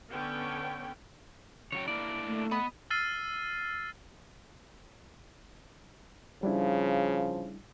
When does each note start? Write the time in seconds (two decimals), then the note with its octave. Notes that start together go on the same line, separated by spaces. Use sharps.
0.11 D3 B3 C#4 G5
1.72 C#3 F#3 C#5 G5
1.88 A#3 D4 E4 D5
2.25 A3
2.51 B3 D#5 B5
2.90 E6 F6 A6 C7 D#7
6.43 C#3 F3 G3 D4 E4